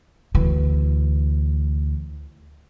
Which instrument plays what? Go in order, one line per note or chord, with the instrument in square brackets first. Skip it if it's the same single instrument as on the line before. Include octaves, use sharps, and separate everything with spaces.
[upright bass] D2 E3